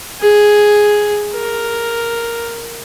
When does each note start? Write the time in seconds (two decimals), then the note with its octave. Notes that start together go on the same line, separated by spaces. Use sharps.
0.20 G#4
1.34 A#4